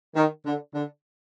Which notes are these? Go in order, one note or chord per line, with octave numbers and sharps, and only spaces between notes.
D#3
D3
D3